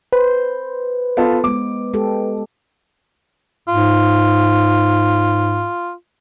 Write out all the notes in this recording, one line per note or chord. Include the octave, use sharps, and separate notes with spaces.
B4 C5
B3 F4 A4
G#3 B3 D6
G#3 G4 A4
G#2 F4